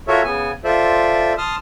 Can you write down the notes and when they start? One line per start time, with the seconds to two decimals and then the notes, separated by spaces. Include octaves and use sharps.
0.08 F4 F#4 A4 A#4 C#5 E5
0.24 C#3 B3 G#5
0.64 F4 A4 C5 D5 E5
1.38 A5 C6 D#6 F6